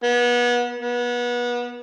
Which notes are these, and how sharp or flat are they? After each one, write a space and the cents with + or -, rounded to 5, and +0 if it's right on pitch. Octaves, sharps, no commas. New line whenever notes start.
B3 -30
B3 -30